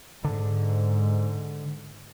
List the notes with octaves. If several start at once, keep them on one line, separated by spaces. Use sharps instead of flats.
G#2 D3